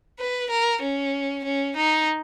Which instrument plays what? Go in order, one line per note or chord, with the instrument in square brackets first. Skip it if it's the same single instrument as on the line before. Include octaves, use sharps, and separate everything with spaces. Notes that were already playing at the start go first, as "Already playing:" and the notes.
[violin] B4
A#4
C#4
C#4
D#4